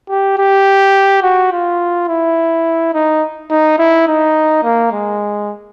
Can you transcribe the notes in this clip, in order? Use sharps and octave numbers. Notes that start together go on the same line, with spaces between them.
G4
G4
F#4
F4
E4
D#4
D#4
E4
D#4
A#3
G#3